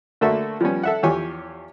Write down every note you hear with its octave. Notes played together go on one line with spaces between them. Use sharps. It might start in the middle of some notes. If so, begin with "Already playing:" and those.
D3 A3 A#3 F#4 A4 E5
F3 G3 B3 C#4
A4 E5 F#5
E2 F3 G4 C#5 G#5 C#6